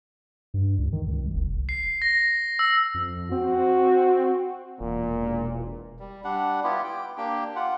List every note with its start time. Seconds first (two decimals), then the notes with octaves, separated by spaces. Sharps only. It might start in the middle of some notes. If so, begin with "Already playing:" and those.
0.54 G2
0.78 C#2
0.93 D#3
1.07 C#2
1.22 C2
1.34 F1
1.69 C7
2.02 A#6
2.59 E6
2.94 F2
3.32 C4 F#4
4.81 E1 A#2
5.99 G3
6.24 G3 D4 F#5
6.64 B3 E4 F4 G4
6.84 G5
7.17 A#3 D4 G4 G5
7.56 F4 F#5